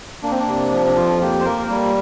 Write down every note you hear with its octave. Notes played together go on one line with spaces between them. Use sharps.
A#3 D4
C4
D4
C3
F3
D4
F2 F4
A#3 G4
C5
A#3 A#4
G3